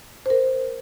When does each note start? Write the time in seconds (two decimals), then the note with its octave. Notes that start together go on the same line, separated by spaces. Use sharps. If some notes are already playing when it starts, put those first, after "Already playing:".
0.26 C5
0.30 A#4